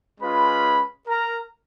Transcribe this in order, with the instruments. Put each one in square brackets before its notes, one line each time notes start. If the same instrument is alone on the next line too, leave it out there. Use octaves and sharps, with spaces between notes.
[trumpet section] G#3 C#4 F4 B4 B5
A#4 A#5